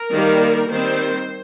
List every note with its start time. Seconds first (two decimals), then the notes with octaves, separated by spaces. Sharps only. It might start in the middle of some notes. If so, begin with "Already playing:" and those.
Already playing: A#4
0.12 D#3 G3 A#3
0.70 D#3 G3 C4 C5